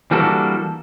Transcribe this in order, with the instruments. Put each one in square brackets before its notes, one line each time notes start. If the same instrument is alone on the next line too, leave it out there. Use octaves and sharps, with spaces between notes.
[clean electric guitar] E3 G3 A#3 D4 F#4 A4